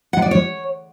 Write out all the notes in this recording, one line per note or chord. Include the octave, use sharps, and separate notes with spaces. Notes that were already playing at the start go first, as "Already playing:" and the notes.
F#5
D5
C#5